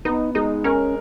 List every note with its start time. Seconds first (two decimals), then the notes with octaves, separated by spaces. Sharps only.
0.05 B3 D#4
0.35 G#3 D#4
0.64 C#4 A#4